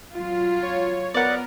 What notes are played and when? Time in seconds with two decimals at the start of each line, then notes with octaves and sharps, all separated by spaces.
0.15 F#3 F4
0.63 C#5
1.14 B3 A#4 D5 F#5